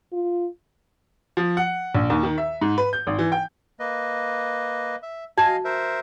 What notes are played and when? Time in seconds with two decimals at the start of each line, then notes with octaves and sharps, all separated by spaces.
0.13 F4
1.37 F3
1.57 F#5
1.95 A#1
2.10 D#2
2.23 D#3
2.38 E5
2.61 G#2
2.78 B4
2.93 G6
3.07 G#1
3.19 E3
3.32 G5
3.80 A#3 B4 D#5
5.03 E5
5.38 F#4 D#5 F5 G#5 A5 G#6
5.65 A#4 C5 E5